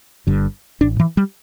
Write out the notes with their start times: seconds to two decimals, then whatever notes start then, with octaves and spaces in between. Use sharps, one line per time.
0.27 G1 G2 D3
0.81 A1 A2 D4
1.00 E3
1.17 G3